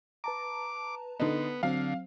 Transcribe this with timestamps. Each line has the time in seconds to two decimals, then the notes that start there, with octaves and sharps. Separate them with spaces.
0.24 B4 A5 A#5 D6
1.20 D3 B3 D#4
1.63 D3 F#3 C4 F5